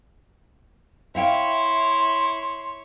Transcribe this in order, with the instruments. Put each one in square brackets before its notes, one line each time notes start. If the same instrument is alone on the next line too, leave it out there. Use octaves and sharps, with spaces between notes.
[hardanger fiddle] E4 C#5 [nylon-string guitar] E5 F5 G5 [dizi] C6